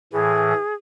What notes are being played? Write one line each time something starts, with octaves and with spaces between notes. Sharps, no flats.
A2 E3 G#4